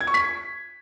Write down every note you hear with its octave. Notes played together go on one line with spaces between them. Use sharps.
G#6
C#6
B6